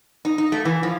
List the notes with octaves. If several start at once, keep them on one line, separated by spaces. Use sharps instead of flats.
D#4
D#4
A3
E3
F3